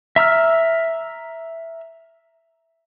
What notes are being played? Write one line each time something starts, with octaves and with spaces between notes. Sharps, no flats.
E5 A#5 E6 F6